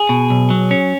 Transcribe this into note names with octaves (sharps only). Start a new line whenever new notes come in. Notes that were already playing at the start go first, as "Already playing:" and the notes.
Already playing: G#4
B2
B1
F#3
C#4